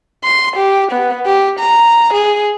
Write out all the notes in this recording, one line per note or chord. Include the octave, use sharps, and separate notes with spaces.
C6
G4
B3
G4
A#5
G#4